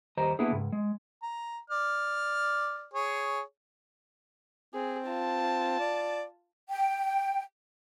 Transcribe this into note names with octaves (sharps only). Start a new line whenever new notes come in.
D#2 G3 C5 D#5 A#5
A#3 B3 D4 E4 G#4
C#2 G#2
G#3
A#5
D5 F6
G#4 C#5
C4 G#4
F4 A5
D5
G5